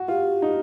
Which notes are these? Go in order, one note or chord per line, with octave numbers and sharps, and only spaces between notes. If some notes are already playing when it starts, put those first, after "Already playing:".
Already playing: F#4
F4 G4
D#4